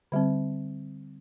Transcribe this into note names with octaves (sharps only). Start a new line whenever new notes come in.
D3 G3 C4